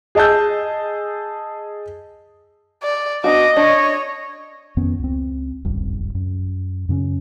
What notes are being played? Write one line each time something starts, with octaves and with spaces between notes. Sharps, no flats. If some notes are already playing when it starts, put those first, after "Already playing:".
G#4 D#5 A5 E6 G6
D5
B3 D4 F#4 D#5 D6
D4 C#5
F2 D#3 B3 C#4
C#2 C4
D#1 G#1 C#2 G2
F#2
F#2 C#3 C4 C#4